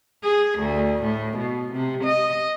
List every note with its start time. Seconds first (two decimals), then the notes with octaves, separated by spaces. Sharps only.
0.23 G#4
0.59 D2
1.03 A2
1.37 B2
1.73 C3
2.04 D#5